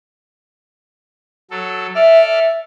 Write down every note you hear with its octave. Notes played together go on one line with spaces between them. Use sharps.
F#3 A4
A4 D5 E5 F6